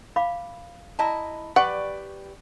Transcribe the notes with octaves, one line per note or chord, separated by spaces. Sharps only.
F5 B5 D6
E4 D#5 A5 A#5
G4 B4 D5 F#5 C#6